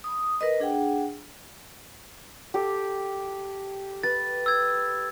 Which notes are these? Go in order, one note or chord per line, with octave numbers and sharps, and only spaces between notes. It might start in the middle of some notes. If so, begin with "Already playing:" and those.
B5 D#6
A#4 B4 D#5
D4 G#4 F#5 G5
G4 A4
B4 A6
E6 G#6